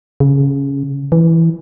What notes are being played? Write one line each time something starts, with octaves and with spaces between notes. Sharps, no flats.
C#3
E3